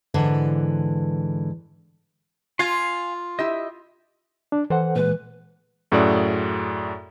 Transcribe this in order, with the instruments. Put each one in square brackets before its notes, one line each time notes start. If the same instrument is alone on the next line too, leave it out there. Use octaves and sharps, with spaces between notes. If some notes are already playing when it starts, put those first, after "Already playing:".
[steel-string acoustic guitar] G#2 D3 E3
[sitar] F4 [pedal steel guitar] F5 G#5 C6
[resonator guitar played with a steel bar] E4 G4 E5 [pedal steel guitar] D#5
[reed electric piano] D4
[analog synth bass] E3 [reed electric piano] A4 C5 F#5
[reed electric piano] A#2 G#3 [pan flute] B4
[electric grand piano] F#2 A2 F#4 G#4 A4 D5